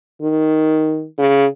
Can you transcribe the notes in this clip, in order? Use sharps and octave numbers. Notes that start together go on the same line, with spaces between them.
D#3
C#3